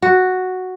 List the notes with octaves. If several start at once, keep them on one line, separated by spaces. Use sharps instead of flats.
F#4